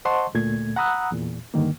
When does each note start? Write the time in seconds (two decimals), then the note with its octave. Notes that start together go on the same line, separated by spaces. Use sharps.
0.05 C5 D#5 F#5 A5 C6 C#6
0.34 D2 A#2 A3 G#6
0.76 F#5 A#5 B5 D#6 E6 F#6
1.12 E2 A#2
1.54 G2 D3 D#3 A#3